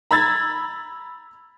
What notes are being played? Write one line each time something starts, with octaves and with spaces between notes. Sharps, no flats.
A#5 B5 E6 G#6 A6